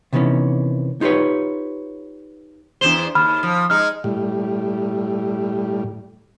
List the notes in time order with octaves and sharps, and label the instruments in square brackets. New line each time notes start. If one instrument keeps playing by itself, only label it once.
[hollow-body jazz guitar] C3 D#3 E3 B3 C#4
D#4 F4 G4 B4 C#5
[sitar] E2 C5 [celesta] D4 E7 G7
[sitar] D#2 [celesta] B5 F6
[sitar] F3
[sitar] G#3 D#4 [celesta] F6
[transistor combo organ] A2 G3